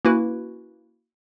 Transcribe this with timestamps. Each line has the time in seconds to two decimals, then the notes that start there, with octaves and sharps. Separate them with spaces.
0.05 A#3 C#4 E4 F#4 B4